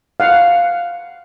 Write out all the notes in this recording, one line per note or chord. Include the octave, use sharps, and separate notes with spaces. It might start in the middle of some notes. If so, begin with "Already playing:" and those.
F5 F#5